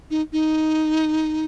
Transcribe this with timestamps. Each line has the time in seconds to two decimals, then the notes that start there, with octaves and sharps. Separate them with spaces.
0.11 D#4
0.33 D#4